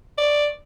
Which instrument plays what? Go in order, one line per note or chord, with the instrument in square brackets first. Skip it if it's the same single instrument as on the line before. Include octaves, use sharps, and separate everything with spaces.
[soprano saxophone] D5